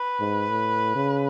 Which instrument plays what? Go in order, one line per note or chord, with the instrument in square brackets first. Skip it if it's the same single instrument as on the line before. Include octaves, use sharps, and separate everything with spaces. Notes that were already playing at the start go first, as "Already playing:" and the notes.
Already playing: [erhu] B4
[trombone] G#2
A2
C#3